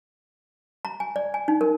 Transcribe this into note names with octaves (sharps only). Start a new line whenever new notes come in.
A#5
G#5
D5
G#5
D#4
A#4